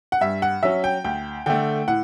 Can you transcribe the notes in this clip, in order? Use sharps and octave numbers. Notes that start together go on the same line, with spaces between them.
F#5
G2 E5
F#5
F#3 C#4 E5
G5
D2 G5
D3 A3 G5
A2 F#5